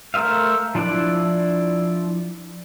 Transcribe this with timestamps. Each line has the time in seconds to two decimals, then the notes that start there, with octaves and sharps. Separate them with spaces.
0.14 A3 A#4 C5 E5 F5
0.75 F3 D4 E4 D5 F#6